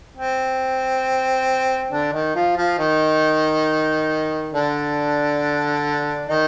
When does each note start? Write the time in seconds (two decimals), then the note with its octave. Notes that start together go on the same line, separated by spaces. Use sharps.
0.17 C4
1.91 D3 D4
2.13 D#3 D#4
2.35 F3 F4
2.56 F3 F4
2.78 D#3 D#4
4.54 D3 D4
6.29 D#3 D#4